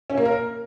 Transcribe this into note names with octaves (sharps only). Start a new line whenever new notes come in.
C#4
A#3
A#4